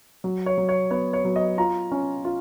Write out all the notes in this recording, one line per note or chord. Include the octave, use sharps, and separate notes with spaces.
F#3
C#5
F#3
C#5
B3 C#5
C#5
F#3
D#5
F4 A#5
C#4
F4